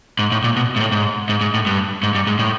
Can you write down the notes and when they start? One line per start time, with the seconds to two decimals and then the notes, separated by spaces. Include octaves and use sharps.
0.19 G#2
0.32 A2
0.44 A#2
0.56 B2
0.76 G#2
0.80 A2
0.92 G#2
1.29 G#2
1.41 G#2
1.54 A2
1.66 G2
2.03 G#2
2.15 G2
2.27 G#2
2.39 A2